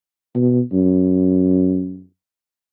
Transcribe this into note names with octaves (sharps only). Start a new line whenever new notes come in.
B2
F#2